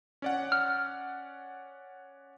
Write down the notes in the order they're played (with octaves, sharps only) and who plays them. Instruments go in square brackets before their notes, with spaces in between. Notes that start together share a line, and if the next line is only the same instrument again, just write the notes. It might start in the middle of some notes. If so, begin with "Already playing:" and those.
[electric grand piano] C#4 D5 F#5
[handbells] F6